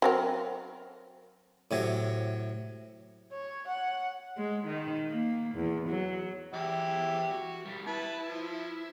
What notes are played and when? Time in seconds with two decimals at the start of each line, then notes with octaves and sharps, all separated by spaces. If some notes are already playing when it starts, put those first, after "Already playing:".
0.02 F#3 C4 A#4
1.71 A2 C3 F#3
3.32 C#5
3.67 F#5
4.37 G#3
4.67 D#3
5.10 A#3
5.55 E2
5.89 F#3
6.53 E2 E4 G4
7.31 F#4
7.66 B1 G3
7.87 E4 B4 A5
8.29 F3